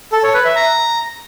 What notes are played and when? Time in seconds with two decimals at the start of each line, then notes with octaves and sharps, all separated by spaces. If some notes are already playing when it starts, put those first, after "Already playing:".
0.13 A4
0.23 C#5
0.34 B4
0.45 E5
0.56 A#5